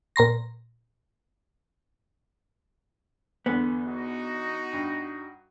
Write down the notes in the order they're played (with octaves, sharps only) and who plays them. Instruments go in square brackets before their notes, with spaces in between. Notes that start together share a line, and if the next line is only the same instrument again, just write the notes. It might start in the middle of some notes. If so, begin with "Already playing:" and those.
[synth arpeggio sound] A#2 A#5 C6 A#6
[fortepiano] E2 D3 [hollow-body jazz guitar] B3
[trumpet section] D#4 F#4
[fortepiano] G2